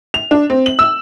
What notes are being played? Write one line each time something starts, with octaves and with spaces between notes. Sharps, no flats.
F7
D4
C4
F#7
E6